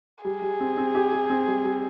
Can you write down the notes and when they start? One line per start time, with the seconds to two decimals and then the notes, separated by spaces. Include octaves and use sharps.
0.25 G3 G#4
0.42 G3
0.60 C4
0.77 C4
0.95 G4
1.13 G4
1.30 C4
1.48 G3
1.65 G3